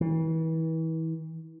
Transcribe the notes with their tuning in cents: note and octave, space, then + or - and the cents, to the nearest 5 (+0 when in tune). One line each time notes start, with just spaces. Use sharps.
E3 -35